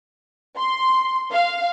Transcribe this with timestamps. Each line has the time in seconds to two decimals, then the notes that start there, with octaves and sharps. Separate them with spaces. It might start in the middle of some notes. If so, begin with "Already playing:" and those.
0.57 C6
1.32 F5